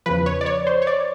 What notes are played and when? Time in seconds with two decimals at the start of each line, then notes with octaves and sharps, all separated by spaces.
0.06 E2 C#3 F3 B4
0.26 C#5
0.41 D5
0.46 C#5
0.67 C5
0.82 C#5
0.87 D5